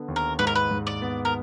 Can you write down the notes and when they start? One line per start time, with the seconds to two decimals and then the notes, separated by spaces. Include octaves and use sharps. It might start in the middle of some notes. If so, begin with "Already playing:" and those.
Already playing: D3 B3
0.08 D#2
0.16 A#4
0.39 G#2 B4
0.47 A#4
0.55 B4
0.71 G#2
0.87 D5
1.02 B3
1.25 A#4